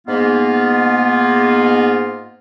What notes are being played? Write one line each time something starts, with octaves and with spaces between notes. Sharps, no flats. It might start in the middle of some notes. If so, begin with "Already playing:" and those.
G#2 A#3 B3 F4